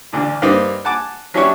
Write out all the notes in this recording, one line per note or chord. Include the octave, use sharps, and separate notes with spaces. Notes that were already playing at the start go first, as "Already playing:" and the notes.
A1 D2 D3
G2 A#3 C4 D#4
F#5 G#5 A5 D6
F#3 C#4 D4 E4 G4 C#5